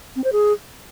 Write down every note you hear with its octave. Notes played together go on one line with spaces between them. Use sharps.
C4
C5
G#4